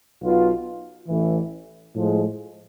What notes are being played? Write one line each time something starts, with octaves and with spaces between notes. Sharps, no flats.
B1 B2 B3 F4
A1 A2 E3
A2 F3 G#3